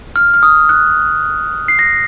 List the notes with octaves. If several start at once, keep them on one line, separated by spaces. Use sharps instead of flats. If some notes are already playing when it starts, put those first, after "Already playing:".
F6
F6
D#6
F#6
C7
A#6